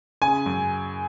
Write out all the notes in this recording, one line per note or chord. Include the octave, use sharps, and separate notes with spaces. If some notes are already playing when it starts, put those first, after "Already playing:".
C#3 G#5
F#2